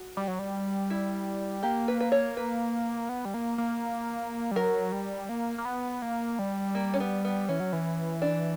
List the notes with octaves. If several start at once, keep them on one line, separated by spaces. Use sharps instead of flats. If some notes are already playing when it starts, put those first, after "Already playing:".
Already playing: F#4
G3
F#3
G3
E4
A#3 G4
B4
B4
C#5
B4
B3
G3
A#3
A#3
G3
F#3 A#4
G3
A#3
A#3
B3
A#3
G3
A#3
C#4
B3
B3
E3 C#4
F#3
E3
D4